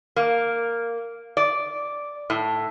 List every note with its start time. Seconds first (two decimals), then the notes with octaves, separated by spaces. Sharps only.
0.16 A#3
1.37 D5
2.30 A2